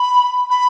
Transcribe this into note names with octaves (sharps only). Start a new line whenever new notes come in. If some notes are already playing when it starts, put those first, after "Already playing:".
Already playing: B5
B5